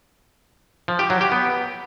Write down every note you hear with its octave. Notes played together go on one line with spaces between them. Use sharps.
F3
G4
F#3
G4
B3